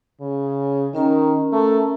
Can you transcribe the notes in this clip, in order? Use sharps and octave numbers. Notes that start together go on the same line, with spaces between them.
C#3
D#3 C#4 A#4 A#5
A3